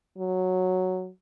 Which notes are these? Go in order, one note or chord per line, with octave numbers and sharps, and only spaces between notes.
F#3